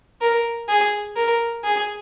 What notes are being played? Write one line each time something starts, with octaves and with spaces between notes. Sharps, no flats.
A#4
G#4
A#4
G#4